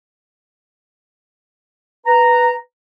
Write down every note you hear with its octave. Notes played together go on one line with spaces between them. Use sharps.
B4 A#5